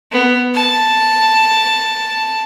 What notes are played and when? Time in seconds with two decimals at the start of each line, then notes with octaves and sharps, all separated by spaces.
0.12 B3
0.55 A5